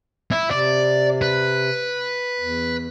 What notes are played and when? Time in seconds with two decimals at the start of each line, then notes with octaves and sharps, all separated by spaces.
0.32 E4
0.51 C3 D5
1.22 B4
2.40 E2